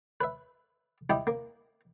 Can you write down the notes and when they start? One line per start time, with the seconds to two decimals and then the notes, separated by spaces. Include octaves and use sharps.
0.21 B4 E5
1.10 G3 E4 G4 D#5
1.27 A#3